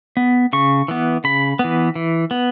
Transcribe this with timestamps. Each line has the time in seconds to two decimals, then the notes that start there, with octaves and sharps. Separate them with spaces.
0.17 B3
0.53 C#3 C#6
0.88 E3 B3
1.24 C#3 B5
1.59 B3
1.64 E3
1.95 E3
2.31 B3